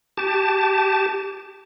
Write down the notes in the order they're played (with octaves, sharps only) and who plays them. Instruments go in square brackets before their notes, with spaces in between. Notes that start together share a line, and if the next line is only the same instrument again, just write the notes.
[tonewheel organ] G4 A5